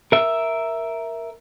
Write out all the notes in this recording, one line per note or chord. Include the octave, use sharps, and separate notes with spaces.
A#4 E5